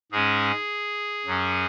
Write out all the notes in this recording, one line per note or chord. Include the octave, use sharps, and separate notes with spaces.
G#2 G#3 C#4 G#4
F#2 F#3 C#4